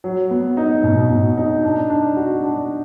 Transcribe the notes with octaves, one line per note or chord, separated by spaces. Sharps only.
F#3
B3
D#4
B2
B2
D#4
D4
D4
F#4
D4